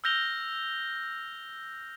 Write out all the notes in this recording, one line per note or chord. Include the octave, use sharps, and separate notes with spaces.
E6 F6 G6 A#6 F7 G7